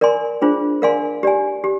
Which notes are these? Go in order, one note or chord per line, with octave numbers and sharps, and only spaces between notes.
A#4 D5 G#5 C6
D4 F4 G#4 C5
A#4 D5 F5 G#5 C6
G4 D5 G#5
G4